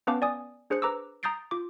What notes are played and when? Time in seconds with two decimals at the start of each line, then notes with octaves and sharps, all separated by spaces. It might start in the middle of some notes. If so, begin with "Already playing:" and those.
0.07 B3 C#4 B4 F5 A5 D6
0.22 D5 G#5 D#6
0.70 D4 G#4 C5 F#6 C#7
0.82 B4 A#5 D6 E6
1.23 A#5 D#6 G6 A6 C7 D7
1.51 F4 D6